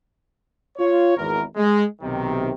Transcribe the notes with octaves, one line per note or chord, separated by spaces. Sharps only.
F4 C#5
G#1 E2 A#4
G#3
B1 C3 D#3